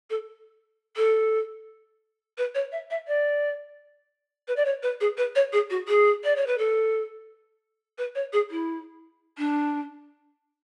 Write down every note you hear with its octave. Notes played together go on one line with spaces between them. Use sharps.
A4
A4
B4
C#5
E5
E5
D5
B4
D5
C#5
B4
G#4
B4
C#5
G#4
F#4
G#4
D5
C#5
B4
A4
B4
C#5
G#4
E4
D4